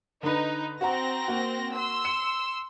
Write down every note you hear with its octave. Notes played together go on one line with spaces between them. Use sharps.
D3 D#4 B4
C4 F#4 F#5 A#5 A#6
A#3 F#4
C6 E6
C#7